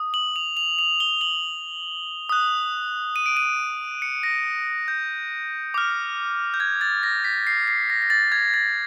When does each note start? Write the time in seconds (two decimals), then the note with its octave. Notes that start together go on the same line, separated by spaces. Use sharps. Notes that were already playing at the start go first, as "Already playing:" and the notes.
Already playing: D#6
0.14 F#7
0.36 F7
0.57 F7
0.79 F7
1.00 G7
1.21 F#7
2.29 D#6 F#6
3.16 D#7
3.26 D7
3.37 D#7
4.02 C#7
4.23 A#6
4.88 G6
5.74 D6 F6
6.54 G6
6.60 G#6
6.81 A6
7.03 A#6
7.24 B6
7.47 C7
7.68 C7
7.90 A#6
8.02 A#6
8.10 A6
8.32 G#6
8.54 A6